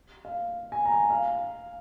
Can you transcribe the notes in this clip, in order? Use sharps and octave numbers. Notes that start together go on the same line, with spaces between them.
F5
G#5
A#5
G#5
F5